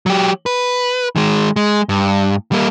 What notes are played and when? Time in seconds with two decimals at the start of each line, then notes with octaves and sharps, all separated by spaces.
0.06 F#3 G4
0.46 B4
1.16 D#3 G#3
1.56 G#3
1.89 G2
2.52 G3 A#3